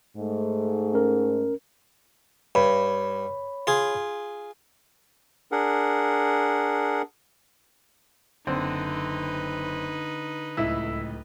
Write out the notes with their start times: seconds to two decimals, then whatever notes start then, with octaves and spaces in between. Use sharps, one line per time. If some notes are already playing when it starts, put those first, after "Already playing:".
0.16 G#2 A3
0.94 C#4 A#4
2.55 G2 C#5 B5
3.67 F4 G#4
5.52 D4 G#4 A#4 F#5
8.47 F#1 D3 C4 D#4 B4
10.57 D1 C#2 A2 E4 E5